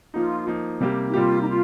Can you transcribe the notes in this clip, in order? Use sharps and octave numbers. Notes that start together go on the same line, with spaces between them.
F3 A#3 D#4 F4
F3 A#3 D#4
C3 G3 A#3 G4
D#4
C3 G3 A#3 F4 G4
D#4
F4